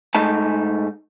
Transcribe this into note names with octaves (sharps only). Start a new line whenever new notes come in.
G#2 A3 D#4 A5